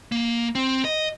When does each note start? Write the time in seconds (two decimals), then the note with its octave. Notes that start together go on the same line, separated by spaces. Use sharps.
0.12 A#3
0.55 C4
0.85 D#5